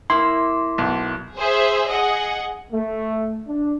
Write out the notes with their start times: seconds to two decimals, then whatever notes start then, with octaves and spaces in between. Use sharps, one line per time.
0.10 A#3 E4 C6
0.78 B1
1.35 G#4 C5 E5
1.89 G#4 D#5 F#5
2.72 A3
3.46 D4